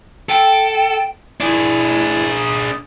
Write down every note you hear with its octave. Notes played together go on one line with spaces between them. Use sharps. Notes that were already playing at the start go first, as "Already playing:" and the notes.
A4 G5
D4 E4 G#4